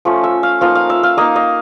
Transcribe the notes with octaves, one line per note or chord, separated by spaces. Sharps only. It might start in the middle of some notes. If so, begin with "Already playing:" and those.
F3 A3 C#4
E5
F5
F3 A#3 D#4 F5
F5
E5
F5
A#3 D#4 D#5
D#5